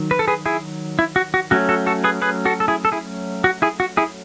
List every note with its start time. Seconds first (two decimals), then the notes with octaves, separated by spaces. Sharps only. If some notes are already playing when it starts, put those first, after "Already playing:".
Already playing: D#3 F#3
0.11 B4
0.19 A4
0.28 G#4 B4
0.46 E4 G#4
0.99 E4
1.16 F#4
1.34 F#4
1.51 F#3 A3 C#4 F#4
1.69 F#4 A4
1.87 F#4 A4
2.04 G#4 B4
2.22 G#4 B4
2.45 F#4 A4
2.60 A4
2.68 E4 G#4
2.85 A4
2.92 E4 G#4
3.44 F#4
3.62 E4 G#4
3.80 F#4
3.97 E4 G#4